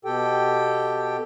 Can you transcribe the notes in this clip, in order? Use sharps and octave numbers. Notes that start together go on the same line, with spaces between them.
B2 G4 A4 G5